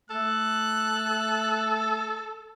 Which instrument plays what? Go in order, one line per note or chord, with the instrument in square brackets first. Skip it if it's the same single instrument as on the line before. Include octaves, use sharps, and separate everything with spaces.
[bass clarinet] A3 [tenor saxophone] A4 [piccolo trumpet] F#6